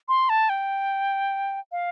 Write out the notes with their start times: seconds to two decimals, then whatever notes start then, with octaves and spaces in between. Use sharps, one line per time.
0.09 C6
0.29 A5
0.49 G5
1.72 F5